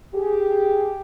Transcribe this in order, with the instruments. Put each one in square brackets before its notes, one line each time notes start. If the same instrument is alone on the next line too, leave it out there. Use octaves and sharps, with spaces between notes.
[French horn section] G4 G#4